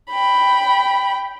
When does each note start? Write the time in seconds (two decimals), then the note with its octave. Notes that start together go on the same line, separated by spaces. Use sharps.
0.10 G5 B5